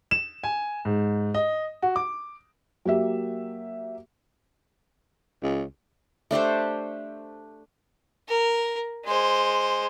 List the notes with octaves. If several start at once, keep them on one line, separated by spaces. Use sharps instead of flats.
E7
G#5
G#2
D#5
F#4
D6
F#3 A#3 G4 E5
C#2
A3 D4 G4 C5
A#4
G#3 C5